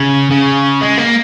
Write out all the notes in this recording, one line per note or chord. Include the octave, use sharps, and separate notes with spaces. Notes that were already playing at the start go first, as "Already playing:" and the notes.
Already playing: C#3
C#3
G#3
A#3